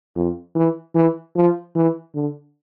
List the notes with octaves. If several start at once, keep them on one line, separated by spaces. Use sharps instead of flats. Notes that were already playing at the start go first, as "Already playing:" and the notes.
F2
E3
E3
F3
E3
D3